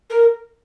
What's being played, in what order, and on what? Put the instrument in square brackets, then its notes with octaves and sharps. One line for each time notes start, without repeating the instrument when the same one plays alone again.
[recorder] A#4